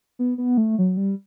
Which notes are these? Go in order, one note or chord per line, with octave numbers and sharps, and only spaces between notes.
B3
B3
A3
F#3
G3